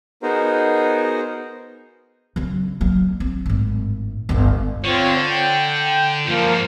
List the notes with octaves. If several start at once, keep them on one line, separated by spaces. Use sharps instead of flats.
B3 D#4 F#4 G#4 A#4 C5
C#3 F#3
F#3 A#3
C4
G#1 A2
G1 C#2
D3 C4 F4 C#5
G5
F#2 F3 G3 A#3 F4
G#2